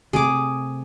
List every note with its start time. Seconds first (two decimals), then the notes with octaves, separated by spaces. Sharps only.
0.13 C3 A3 C4 G#4 D6